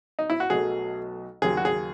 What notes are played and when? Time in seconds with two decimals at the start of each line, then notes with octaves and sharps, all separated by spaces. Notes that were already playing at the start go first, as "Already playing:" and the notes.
0.19 D#4
0.30 E4
0.40 F#4
0.50 B1 B2 F#3 A3 G#4
1.42 D#2 C#3 F#3 G#4
1.57 F#4
1.65 G#4